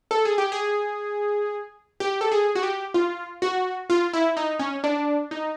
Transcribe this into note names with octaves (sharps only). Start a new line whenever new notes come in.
A4
G#4
G4
G#4
G4
A4
G#4
F#4
G4
F4
F#4
F4
E4
D#4
C#4
D4
D#4